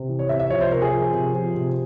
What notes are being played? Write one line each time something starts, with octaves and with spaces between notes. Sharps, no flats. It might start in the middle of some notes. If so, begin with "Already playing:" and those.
Already playing: C3
E3
C#5
C3 E5
E5
F3 C#5
C5
C3 A#4
G#4
F3
C3
F3
C3